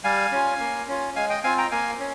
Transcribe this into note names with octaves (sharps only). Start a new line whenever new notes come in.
G3 F5 G#5
C#4 F4
A#3
C#4 F4
G#3 F5 G#5
D#5 G5
C4 F4 F5 G#5
G5 A#5
A#3 F5 G#5
C#4